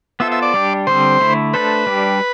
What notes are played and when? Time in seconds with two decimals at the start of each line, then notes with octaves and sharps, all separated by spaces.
0.20 B3 F4 A4 C5 E5
0.32 E5
0.42 D5
0.54 G3 D4 G4
0.87 D3 G3 C4 C5
1.20 D3 A3 E4
1.53 A3 D4 A4 B4 C5
1.87 G3 D4 G4